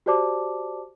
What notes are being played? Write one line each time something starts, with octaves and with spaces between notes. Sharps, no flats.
F#4 G4 C5 D5 A5 D6